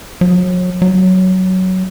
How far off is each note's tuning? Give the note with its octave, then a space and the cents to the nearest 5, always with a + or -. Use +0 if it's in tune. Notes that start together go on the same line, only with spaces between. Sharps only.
F#3 -35
F#3 +10